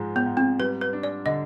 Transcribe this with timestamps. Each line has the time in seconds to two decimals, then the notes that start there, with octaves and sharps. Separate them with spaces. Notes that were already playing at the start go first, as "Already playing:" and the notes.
Already playing: G#2 F3 G#3
0.16 B3
0.26 G#2
0.37 C4
0.60 G3 B4
0.81 B4
0.93 D4
1.03 D5
1.26 D3 D#5